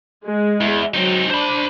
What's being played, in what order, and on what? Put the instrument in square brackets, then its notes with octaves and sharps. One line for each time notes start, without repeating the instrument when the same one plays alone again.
[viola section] G#3
[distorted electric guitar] E2
[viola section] F#3 [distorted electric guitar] C4 D#4
[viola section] D4 [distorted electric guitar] C5 B5